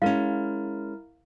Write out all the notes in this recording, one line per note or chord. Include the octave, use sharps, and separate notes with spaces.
G#3 C#4 E4 A#4 F5